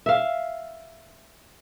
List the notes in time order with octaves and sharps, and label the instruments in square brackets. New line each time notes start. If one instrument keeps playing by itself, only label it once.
[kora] E5 F5